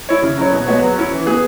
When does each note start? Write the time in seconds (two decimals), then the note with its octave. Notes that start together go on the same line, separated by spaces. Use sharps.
0.09 E4 C#5
0.23 C#3
0.38 F#3 E4 C#5
0.53 B2
0.67 G#3 B3 F#4 C#5
0.81 F#3
0.96 C#4 E4
1.12 E3
1.26 B3 G#4